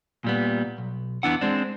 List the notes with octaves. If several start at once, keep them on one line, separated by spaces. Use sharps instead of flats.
A#2 G3 B3
B1
E2 G2 B3 D4 E4 F#5
G#3 C4 D4